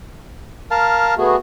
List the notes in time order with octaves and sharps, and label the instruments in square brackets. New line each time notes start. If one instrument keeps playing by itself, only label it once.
[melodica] A#4 F5 A5
[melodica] A3 [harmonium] B3 F#4 G#4